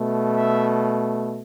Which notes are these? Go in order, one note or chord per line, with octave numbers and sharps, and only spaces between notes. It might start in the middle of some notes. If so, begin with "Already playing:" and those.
Already playing: B2 A3
E5